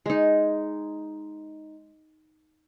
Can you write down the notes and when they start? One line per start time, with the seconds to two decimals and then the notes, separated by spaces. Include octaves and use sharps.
0.06 G#3 D#4